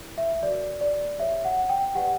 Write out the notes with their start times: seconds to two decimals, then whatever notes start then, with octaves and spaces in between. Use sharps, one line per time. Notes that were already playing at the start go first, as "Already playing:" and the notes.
Already playing: E4 A#4 C#5
0.18 E5
0.43 F#4 A#4 C#5 D5
0.81 D5
1.18 G4 C#5 E5
1.45 F#5
1.69 G5
1.95 G4 B4 D5 F#5